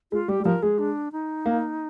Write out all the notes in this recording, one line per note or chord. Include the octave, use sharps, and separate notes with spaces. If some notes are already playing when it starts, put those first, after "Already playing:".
G#3 F4
G3 G4
G3
F3 A#4
G#3 G#4
D4
D#4
A#3